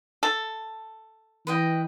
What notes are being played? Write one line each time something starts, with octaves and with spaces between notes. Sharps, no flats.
A4
E3 B4 D#5 G5